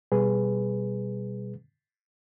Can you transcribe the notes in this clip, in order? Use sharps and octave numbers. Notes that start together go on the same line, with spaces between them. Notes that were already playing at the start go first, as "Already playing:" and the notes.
B2 G3 G#4 B4